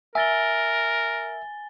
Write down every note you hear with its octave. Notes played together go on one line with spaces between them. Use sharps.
A#4 E5 G#5 A6 G7